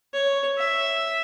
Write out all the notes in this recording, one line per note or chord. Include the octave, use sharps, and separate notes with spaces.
C#5
E5